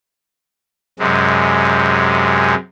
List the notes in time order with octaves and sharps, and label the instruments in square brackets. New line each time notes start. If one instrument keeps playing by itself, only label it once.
[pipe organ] F#2 C3 G#3